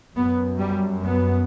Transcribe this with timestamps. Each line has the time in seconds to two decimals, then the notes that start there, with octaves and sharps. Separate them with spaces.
0.16 F#2 B3
0.59 G3
1.04 B3